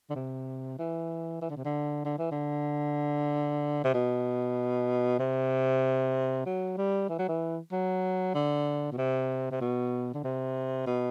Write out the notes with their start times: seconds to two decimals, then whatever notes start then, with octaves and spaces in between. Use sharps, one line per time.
0.10 D3
0.15 C3
0.78 E3
1.42 E3
1.49 D3
1.57 C3
1.65 D3
2.05 D3
2.18 E3
2.31 D3
3.84 C3
3.94 B2
5.19 C3
6.46 F#3
6.77 G3
7.09 E3
7.18 F#3
7.28 E3
7.72 F#3
8.34 D3
8.92 B2
8.98 C3
9.51 C3
9.61 B2
10.14 D3
10.24 C3
10.87 B2